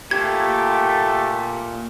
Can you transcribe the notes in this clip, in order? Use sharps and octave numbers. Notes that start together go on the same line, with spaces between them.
A#2 A3 G4 G#6